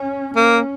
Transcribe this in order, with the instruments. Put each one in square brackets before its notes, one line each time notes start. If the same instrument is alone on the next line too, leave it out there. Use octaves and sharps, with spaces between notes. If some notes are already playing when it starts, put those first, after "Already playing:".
Already playing: [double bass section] C#4
[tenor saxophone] A#3 [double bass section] C#4